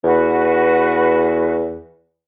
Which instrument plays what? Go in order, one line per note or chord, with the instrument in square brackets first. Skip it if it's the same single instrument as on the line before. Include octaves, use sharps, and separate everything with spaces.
[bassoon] E2 [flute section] F#4 B4